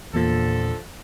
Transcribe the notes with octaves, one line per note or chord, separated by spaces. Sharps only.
E2 A#2 D3 F3 A4